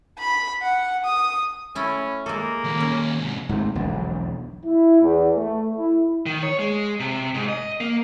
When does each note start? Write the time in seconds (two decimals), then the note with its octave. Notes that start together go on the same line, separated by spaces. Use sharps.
0.19 B5
0.62 F#5
1.05 D#6
1.75 A3 C#4 E4
2.26 G#3 A#3 A4
2.65 D#2 A#2
2.80 C#4
3.18 G#2 C3
3.49 G#2 C3 A3
3.75 E1 B1 F2 D3
4.65 E4
5.02 E2
5.35 A3
5.76 E4
6.26 D#3
6.43 C#5
6.59 G#3
7.00 C3
7.34 G#2
7.49 D#5
7.81 A#3